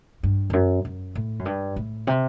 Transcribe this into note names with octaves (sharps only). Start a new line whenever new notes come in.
G2
E2
F#2
F#2
A2
F#2
G2
A2
C3